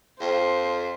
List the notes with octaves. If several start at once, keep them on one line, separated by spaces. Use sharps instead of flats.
F2 C5